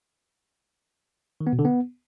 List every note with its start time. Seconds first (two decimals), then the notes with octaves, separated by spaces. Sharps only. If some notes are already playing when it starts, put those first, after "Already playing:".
1.41 D#3
1.47 B3
1.53 B2
1.59 D3
1.65 B3